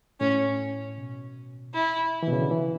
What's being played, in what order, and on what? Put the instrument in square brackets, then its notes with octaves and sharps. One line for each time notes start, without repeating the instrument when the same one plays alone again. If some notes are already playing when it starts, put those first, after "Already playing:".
[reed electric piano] A2 [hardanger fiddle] C#4
[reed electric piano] B2
[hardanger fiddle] E4
[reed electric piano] E3
B2
C#3
D3
E3